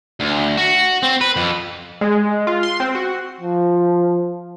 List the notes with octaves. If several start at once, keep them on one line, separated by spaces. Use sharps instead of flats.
D2
F#4
C4
B4
F2
G#3
F4
C6
C4
F#4
F3